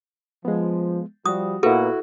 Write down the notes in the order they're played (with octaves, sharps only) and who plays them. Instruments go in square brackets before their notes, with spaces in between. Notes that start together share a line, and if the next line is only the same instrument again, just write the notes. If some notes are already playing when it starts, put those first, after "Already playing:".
[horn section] F3 [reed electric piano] G#3 B3
[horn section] F3 G3 [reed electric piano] F#4 [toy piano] D#6
[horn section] A#2 A#3 B3 [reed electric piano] E4 F#4 [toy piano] A4 B4